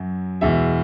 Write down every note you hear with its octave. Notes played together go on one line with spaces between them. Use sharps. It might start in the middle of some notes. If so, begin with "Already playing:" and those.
Already playing: F#2 F#3
E2 B2 G#3 E5